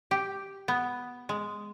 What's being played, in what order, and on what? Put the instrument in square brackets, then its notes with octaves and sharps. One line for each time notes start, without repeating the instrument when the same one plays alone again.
[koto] G4
B3
G#3